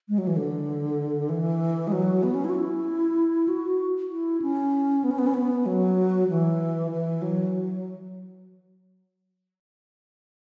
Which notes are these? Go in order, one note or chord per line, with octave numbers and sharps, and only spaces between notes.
G#3
F#3
E3
D3
E3
G#3
F#3
B3
C#4
E4
F#4
E4
F#4
E4
C#4
B3
C#4
B3
C#4
B3
F#3
E3
E3
F#3